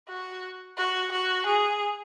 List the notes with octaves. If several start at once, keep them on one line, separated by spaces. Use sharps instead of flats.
F#4
F#4
F#4
G#4